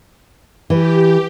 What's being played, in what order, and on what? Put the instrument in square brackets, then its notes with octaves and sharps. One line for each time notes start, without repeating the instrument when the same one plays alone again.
[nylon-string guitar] E3 [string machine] G4